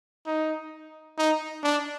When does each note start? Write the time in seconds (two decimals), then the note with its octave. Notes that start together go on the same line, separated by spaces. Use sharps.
0.26 D#4
1.18 D#4
1.63 D4